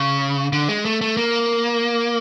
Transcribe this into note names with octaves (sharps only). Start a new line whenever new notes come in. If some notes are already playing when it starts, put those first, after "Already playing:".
Already playing: C#3
D3
G#3
A3
A3
A#3